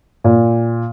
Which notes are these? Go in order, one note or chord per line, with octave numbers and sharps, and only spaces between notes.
A#2